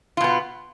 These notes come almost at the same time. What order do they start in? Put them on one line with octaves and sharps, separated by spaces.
F4 B2 B3